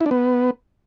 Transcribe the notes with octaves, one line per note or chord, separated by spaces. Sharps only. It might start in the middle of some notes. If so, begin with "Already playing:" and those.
E4
D4
B3